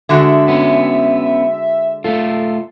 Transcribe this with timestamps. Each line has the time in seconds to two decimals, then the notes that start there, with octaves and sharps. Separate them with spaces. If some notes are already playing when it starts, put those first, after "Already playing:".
0.09 D3 G#3 F#4 E5
0.48 B3 C#4
2.04 A3 F4 A4